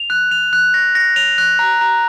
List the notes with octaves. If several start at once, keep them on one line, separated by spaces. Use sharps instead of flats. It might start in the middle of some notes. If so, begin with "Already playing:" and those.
Already playing: F7
F#6
F7
F#6
A#6
A#6
F7
F#6
A#5
A#5